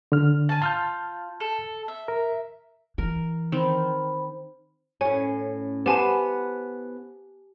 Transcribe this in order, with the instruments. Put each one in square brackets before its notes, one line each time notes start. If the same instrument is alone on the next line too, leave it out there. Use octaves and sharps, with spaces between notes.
[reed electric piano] D3 F6
[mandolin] G#5 A5
[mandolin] F4 [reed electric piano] A5 F6 G6
[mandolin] A4
E5
[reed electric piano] A#4
[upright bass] E3 [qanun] A#4
[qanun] D#3 C4 [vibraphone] C5 B5
[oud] A2 C#4 [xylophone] G#5
[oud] B3 E4 C5 [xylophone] G4 G#5 A5